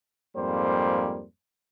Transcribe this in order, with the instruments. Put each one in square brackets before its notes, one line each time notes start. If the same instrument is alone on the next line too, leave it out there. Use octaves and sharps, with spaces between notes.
[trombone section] F2 G#2 G3 A#3 C5